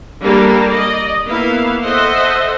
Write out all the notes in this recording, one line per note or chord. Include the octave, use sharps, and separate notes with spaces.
G3 A#3 D4 A4 A#4
D5 D#5
A#3 B3 E4 F5
A4 C5 D#5 E5 F#5